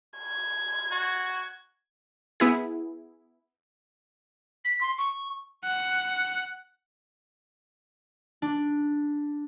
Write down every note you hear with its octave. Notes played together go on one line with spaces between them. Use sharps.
G#6
F#4
B3 E4 G#4
B6
C6
C#6
F#5
D4